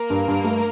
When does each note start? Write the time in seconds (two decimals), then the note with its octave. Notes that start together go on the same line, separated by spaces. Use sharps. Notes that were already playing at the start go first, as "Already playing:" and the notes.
Already playing: A#3 A#4
0.10 G2
0.28 G2
0.44 A3